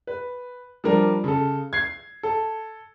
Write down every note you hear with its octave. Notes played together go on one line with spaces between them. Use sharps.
B4
F3 G3 D4 A#4
C#3 A4
G#6 C7
A4